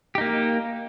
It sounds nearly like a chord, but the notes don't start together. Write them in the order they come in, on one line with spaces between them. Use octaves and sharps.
G4 D#4 A#3